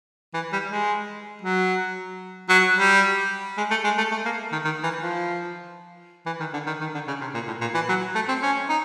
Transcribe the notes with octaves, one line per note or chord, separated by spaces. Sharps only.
E3
G3
G#3
F#3
F#3
G3
G#3
A3
G#3
A3
A3
A#3
D#3
D#3
E3
F3
E3
D#3
D3
D#3
D#3
D3
C#3
C3
A#2
A2
A#2
E3
F#3
A3
C4
C#4
D#4